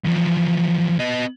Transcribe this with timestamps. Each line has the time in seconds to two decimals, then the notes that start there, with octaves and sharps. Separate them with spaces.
0.04 E2 F3
0.99 B3 D#5